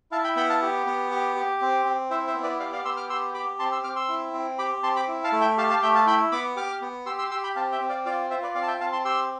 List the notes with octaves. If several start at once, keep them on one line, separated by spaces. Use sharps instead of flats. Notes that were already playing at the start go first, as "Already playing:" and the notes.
E4 F5 A5
G5 B5
B3 G5 B5
F5 A5
G4
B3
G4
G4
C4
C4
E4 C5 E5
C5 E5
B3
B4 D5
G4 D5 F5
D5 F5
B3 C6 E6
D6 F6
G4 C6 E6
G4 B5 D6
C4 A5 C6
C6 E6
C4 D6 F6
C6 E6
E4
C4
G4 B5 D6
C4 A5 C6
B5 D6
E4
F5 A5
A3
E5 G5
G4 F5 A5
F5 A5
A3 E5 G5
F5 A5
E4 G5 B5
B3 B5 D6
G4 D6 F6
B3
G4 C6 E6
C6 E6
G4 C6 E6
G5 B5
C4 F5 A5
E5 G5
C4
D5 F5
F4 D5 F5
F4 C5 E5
B4 D5
C4 D5 F5
A5
E5 G5
C4 F5 A5
A5 C6
G4 C6 E6